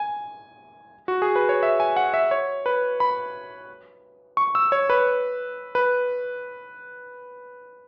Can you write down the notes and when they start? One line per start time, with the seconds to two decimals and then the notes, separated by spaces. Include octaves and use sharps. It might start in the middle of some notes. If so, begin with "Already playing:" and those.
Already playing: G#5
1.08 F#4
1.22 G#4
1.36 B4
1.49 C#5
1.63 E5
1.80 G#5
1.96 F#5
2.14 E5
2.31 C#5
2.66 B4
3.00 B5
4.37 C#6
4.55 E6
4.72 C#5
4.90 B4
5.75 B4